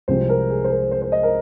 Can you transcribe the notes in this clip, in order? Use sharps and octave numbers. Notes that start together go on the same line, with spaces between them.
C2 C3 F3 G#3 C5
A#4
G#4
C5
A#4
C5
C5
D#5
A#4